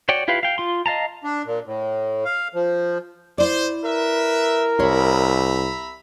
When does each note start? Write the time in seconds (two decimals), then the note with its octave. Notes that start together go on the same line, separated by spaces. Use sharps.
0.09 F#4 C#5 D5 G5
0.28 E4 F4 G4 B4 F5
0.43 F5 G5
0.58 F4 C6
0.86 D#5 F5 A5 A#5
1.24 D4
1.45 A#2
1.66 A2
2.25 F5
2.55 F3
3.38 E4 C5 D5
3.84 A#4 B4 E5
4.79 C2 C#5 E5 A#5 B5